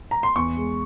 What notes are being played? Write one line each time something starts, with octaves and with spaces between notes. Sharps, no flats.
A#5
C6
E2 C#6
G#3